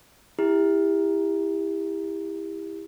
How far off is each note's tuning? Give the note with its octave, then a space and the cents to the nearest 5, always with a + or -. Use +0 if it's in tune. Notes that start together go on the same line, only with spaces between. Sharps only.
E4 -5 G4 +30